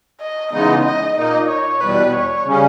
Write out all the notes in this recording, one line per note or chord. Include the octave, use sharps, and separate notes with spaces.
D#5
C#3 E3 G#3 B3 D#4 D#5
D#5
A#2 A#3 D#4 D#5
C#5
E2 B2 G3 B4
C#5
C#3 G3 C#4